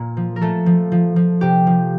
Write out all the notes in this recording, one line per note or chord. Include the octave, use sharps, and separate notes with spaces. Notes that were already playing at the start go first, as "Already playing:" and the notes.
Already playing: A#2 A#3
F3
A#4
F3 A3 A4
F3
F3
F3
C3 G4
F3